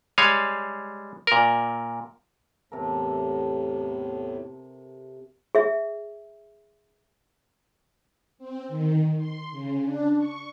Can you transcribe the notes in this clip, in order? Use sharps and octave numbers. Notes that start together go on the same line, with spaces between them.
G3 G#3 C#5 F5 G#5
A#2 A#4
E2 A2 C3 A4 A#4
G#4 E5
C4
D#3
C6
C#3
D4
C#6